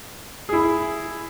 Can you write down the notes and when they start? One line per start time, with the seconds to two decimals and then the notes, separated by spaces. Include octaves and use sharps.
0.49 E4 G#4